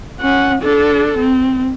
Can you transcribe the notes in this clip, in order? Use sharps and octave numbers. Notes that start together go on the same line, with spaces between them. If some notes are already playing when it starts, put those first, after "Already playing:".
C#4 F#5
D4 A4
C4